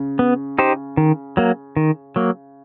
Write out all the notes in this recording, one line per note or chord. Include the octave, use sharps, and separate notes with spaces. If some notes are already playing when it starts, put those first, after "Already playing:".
Already playing: C#3
B3
D#4 G4 C5
D#3
F#3 A#3
D#3
F#3 A#3